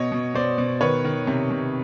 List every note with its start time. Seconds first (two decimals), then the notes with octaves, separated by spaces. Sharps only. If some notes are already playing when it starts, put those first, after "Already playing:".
Already playing: B2 C#5 D#5
0.12 B2
0.34 B2 C5 D5
0.58 B2
0.81 D#3 B4 C#5
1.05 D#3
1.27 C3
1.50 C3